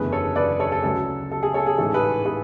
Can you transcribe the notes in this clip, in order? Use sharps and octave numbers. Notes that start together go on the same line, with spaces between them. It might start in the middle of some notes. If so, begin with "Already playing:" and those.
Already playing: F#1 E2 D3 A3 G#4 B4
A4 C#5
B4 D5
A4 C#5
A4
D2 C#3 F#3 A4
A4
G#4
A4 C#5
G#4
A1 G#2 E3 A3 A4
G#4 B4
G#4 B4